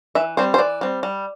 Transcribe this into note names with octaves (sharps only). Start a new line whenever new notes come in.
E3 E5
G3 C4 C5
C5
E3 D5
G3 C4
G3